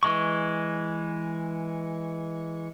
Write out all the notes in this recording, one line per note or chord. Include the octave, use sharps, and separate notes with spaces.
E3 G#3 C#6